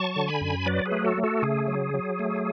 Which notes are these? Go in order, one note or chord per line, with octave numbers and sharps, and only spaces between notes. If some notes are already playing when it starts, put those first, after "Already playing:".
Already playing: F#3 A5 C#6
D3
G#5 B5
F#2
F#3 B4 D5
G#4 B4
A3
F#4 A4
A3
F#4 A4
C#3 G#4
F#3
F#3
A3